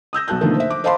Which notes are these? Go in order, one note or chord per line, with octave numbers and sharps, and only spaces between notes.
D#6 E6 G6 A#6
B1 F#4 A5 F#6 G6
B2 D3 D#3 F3 A3 A#3
C5 E5
D6
C5 D#5 F5 A5 B5 C6